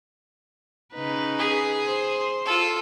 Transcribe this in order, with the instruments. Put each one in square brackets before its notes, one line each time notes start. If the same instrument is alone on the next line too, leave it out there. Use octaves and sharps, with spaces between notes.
[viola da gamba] C#3 D#4 B4
[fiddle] G#4
[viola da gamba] C5
[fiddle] F4 A4